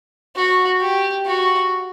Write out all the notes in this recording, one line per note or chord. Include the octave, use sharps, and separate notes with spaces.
F#4
G4
F#4